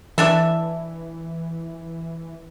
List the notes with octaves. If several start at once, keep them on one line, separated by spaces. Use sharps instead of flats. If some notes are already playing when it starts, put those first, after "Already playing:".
E3 D4 A4 E5